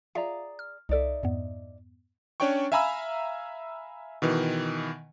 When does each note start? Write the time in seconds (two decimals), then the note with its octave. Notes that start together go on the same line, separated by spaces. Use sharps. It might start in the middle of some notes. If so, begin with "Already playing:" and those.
0.15 F4 G#4 D5 E5 F5 A#5
0.59 F6
0.89 C2 D#4 A4 D5 E5
1.23 F2 G#2 B3
2.40 C#4 D4 C#5 D5 G5 C#6
2.72 E5 F5 G#5 A#5 B5 E6
4.22 B2 D#3 E3